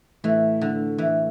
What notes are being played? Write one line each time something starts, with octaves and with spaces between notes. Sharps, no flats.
A2 E3 A3 E4
D3
E3